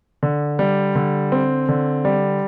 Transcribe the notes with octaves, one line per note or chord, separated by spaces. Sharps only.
D3
G3
D3
C4
D3
G3